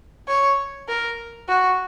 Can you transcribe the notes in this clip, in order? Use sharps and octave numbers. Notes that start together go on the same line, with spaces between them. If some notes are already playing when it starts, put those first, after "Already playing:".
C#5
A#4
F#4